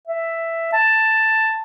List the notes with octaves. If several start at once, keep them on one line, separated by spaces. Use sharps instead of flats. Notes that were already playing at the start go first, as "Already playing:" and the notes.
E5
A5